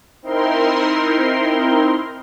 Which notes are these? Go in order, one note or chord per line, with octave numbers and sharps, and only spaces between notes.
C4 D#4 E4 A#4 C6